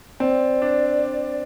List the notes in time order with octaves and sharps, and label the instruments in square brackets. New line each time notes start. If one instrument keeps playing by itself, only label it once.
[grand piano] C4 [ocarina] D5
[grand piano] D4